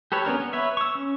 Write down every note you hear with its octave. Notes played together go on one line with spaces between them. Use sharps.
G4 A4 B4 C#5
B3 C#4 D4 A#4
B3
B4 C#5 E5
C#6 E6
C#4